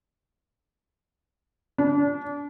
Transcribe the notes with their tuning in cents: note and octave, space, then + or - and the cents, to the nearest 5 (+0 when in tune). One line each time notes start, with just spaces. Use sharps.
D4 -30